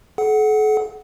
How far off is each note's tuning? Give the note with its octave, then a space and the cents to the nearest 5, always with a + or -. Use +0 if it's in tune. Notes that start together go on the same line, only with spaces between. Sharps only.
A4 -45 F#5 +5